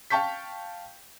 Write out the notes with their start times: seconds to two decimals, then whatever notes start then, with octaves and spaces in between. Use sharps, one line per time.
0.10 F5 G5 A5 C#6 G6 B6